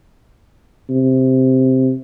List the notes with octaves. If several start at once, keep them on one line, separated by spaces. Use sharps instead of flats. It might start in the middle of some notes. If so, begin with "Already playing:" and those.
C3